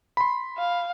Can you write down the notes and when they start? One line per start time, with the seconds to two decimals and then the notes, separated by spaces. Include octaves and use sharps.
0.17 B5 C6
0.58 F5